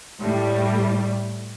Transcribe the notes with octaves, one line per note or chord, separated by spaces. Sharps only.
A2 G3